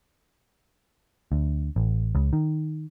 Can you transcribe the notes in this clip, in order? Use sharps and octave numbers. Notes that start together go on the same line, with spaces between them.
D2
A1
C#2
D#3